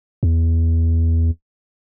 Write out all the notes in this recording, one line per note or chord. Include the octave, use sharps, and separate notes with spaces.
E2